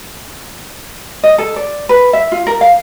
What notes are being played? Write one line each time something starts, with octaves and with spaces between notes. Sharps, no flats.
D#5
A4
D5
B4
E5
F4
A#4
F5